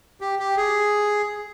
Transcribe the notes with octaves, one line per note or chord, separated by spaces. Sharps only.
G4
G4
G#4